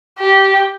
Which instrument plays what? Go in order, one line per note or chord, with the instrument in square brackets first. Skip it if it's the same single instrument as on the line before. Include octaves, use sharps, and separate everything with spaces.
[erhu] G4